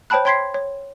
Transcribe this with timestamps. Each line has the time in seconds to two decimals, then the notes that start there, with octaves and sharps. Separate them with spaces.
0.10 C5 C#5 G5 A5 B5 F#6
0.25 C#5 G5 C6 G#6 B6 C7
0.54 C#5